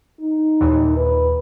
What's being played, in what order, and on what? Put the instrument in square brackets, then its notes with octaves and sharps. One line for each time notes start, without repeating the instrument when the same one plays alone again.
[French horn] D#4
[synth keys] D#2 A#2 E3
[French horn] B4